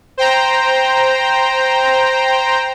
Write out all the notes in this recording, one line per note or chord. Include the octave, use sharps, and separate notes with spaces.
C5 G5 A#5